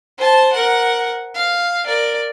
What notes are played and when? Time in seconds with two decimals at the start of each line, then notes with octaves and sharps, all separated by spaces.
0.18 C5 A5
0.53 A#4 F#5
1.35 F5
1.86 A#4 D5